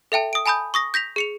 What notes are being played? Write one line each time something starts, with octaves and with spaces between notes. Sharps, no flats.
A4 E5 G5 A5
D#6 D7
G#5 A5 B5 D#6 G6
C#6 D#6 A#6
G6 A#6 B6 F7
G#4 C#7 F7